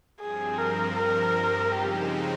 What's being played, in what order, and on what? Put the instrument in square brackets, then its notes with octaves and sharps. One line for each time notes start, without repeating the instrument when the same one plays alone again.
[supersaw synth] G2 F3 C4 [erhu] G#4
[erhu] A#4
A#4
[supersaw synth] C#3 F3 G#3 C4 D#4 [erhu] G4